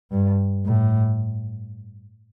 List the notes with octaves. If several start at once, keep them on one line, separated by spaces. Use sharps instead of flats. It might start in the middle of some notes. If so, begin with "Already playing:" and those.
G2
A2